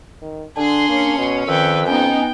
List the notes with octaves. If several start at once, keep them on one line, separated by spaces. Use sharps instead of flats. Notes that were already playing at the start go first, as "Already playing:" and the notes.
D#3
D3 D4 G#4 C6
A#3 C#4
B2
F2 D#3 B4 G5 E6
B3 C#4 D#4 G5